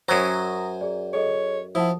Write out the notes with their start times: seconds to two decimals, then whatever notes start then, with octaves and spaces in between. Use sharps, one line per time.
0.08 F#2 F#3 C5 G5 G#5 D#6 A#6
0.81 G#4 D5
1.13 G#4 A4 C#5 D#5
1.75 F3 E4 F#5 A5 D#6